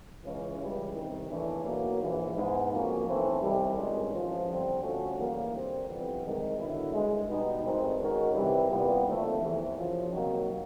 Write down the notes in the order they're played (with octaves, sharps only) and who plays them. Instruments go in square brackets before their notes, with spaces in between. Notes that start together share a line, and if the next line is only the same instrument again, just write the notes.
[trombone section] C#2 C#3 E3 G#3 C#4
C#2 C#3 E3 G3
C2 C3 D#3
E2 C#3 E3 A3 D4
B1 B2 F#3 A#3
A#1 G#2 E3
G#2 E3 G#3 B3
F2 C#3 F#3 A#3 C#4
B1 A2 E3 A3 C4
C2 C3 D#3 G3
G#1 G2 D#3 G#3 C#4
A1 G#2 F3
D3 G3 C4
D3 F3 A3 C#4 F#4
D#2 C#3 E3 G3 A#3
D3 G3 C4
F2 C3 E3 G3 B3
C2 C3 D#3 G#3
D3 F#3 B3 E4
G2 D#3 G#3
B2 G3 B3 D#4
G#1 G2 D#3 G#3 C4
D#3 G#3 C#4 F#4 A#4
C3 E3 G3
C2 A#2 G3 B3
D#2 D3 F3 A3 C4
E2 C3 E3
F#2 C#3 F3
C3 D#3 F#3 A#3